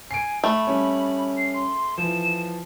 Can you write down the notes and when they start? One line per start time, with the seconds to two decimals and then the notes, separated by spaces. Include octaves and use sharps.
0.11 G#5 C7 D7
0.44 A3 B5
0.67 G3 C#4
1.37 C7
1.54 C6
1.98 E3 F3 E7